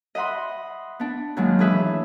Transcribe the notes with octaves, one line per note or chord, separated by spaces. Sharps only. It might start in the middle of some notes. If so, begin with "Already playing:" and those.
D#5 E5 F#5 B5 C6
B3 D4
F#2 D#3 F#3 G#3 A#3 D4
A2 E3 G#4 B4 E5 E6